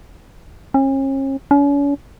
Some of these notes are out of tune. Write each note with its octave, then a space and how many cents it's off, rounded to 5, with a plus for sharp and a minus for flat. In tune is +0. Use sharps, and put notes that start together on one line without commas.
C#4 -40
C#4 +40